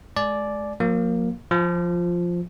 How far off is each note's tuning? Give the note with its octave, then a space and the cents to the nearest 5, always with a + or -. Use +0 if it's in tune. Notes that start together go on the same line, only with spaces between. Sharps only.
G#3 +30 D5 +0 G#5 +40
F3 +45 A#3 +0
F3 +0 F4 +5